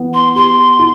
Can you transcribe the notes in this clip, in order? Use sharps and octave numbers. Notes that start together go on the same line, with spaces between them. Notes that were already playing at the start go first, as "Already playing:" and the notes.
Already playing: E3 B3
C6
G4 C6
E4